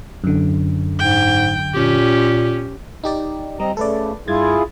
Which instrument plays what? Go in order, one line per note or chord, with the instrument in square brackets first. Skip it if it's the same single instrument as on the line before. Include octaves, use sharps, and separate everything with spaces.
[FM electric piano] F#2 D3
[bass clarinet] G#2 [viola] G5
[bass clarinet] A#2 [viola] C#4 G4
[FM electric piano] D#4 G4 D5
[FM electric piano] G3 [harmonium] C4 D#5 A#5
[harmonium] C#3 A3 [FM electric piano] A4 B4 D5
[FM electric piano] G2 G#6 A6 [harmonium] E4 F4 G#4